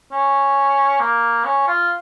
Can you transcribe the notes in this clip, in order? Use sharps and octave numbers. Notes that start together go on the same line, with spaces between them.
C#4
A#3
C#4
F4